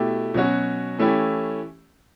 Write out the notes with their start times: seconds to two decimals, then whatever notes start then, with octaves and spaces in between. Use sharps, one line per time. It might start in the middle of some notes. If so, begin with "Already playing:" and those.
Already playing: B2 A3 E4 G4
0.34 B2 F#3 C#4 F#4
0.99 E3 A3 C#4 E4 G4